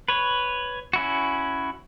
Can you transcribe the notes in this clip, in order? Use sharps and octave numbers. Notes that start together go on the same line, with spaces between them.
B4 C#5
C#4 E4 F#4